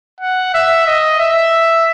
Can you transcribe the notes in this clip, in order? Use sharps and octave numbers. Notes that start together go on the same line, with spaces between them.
F#5
E5
D#5
E5